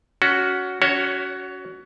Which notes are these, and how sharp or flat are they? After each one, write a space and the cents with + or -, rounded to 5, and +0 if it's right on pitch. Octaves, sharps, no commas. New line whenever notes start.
C#4 +20 F#4 +0
C#4 +30 F#4 +10 C#5 +0